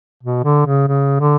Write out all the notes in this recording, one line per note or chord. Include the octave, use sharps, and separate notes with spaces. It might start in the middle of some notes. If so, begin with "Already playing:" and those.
B2
D3
C#3
C#3
D3